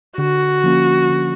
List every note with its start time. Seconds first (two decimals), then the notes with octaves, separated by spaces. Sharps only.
0.18 D3 F#4
0.64 F3 A#3 C#4
1.10 D3